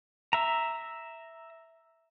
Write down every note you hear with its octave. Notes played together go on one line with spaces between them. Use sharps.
E5 A#5